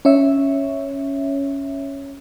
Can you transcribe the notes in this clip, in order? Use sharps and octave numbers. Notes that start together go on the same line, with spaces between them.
C#4 C#5 E5